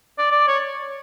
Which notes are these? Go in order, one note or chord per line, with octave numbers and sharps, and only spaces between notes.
D5
D5
C#5